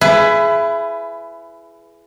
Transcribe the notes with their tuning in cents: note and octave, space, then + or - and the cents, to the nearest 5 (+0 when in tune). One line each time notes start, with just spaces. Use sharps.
E4 +25 G#4 +20 B4 +10